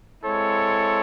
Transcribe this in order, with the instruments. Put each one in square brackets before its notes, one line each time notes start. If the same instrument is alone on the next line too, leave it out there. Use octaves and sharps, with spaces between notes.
[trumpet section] G#3 C4 E4 A4 C#5